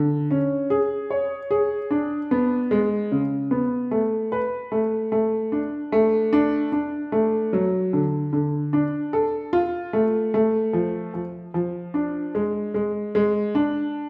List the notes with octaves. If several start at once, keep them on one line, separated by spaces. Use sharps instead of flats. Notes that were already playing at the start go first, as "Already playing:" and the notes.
Already playing: D3
C#4
G#4
C#5
G#4
D4
B3
G#3
C#3
B3
A3
B4
A3
A3
D4
A3
D4
D4
A3
F#3
D3
D3
D4
A4
F4
A3
A3
F3
F3
F3
D4
G#3
G#3
G#3
D4